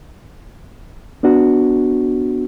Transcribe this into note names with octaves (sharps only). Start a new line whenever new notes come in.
B3 D4 F#4